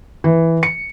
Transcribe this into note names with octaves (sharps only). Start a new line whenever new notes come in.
E3
C#7